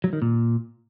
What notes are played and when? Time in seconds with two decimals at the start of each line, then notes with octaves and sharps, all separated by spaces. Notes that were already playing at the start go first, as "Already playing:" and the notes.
0.04 F#3
0.13 D#3
0.22 A#2